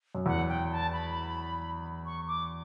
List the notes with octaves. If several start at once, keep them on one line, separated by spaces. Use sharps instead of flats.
F#2
E2 F#5
G5
A5
B5
C#6
D6